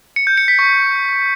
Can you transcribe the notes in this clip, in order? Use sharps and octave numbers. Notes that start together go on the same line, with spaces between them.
C#7
G6
C#7
B6
C#6